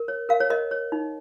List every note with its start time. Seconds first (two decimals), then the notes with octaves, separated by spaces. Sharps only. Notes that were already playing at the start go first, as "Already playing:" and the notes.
Already playing: A#4
0.08 C#5
0.29 A#4 F5
0.40 C#5
0.50 A#4 D#5
0.71 C#5
0.92 D#4